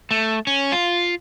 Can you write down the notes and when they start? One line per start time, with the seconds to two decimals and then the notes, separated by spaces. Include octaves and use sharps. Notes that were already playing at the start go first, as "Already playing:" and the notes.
0.11 A3
0.47 C#4
0.72 F4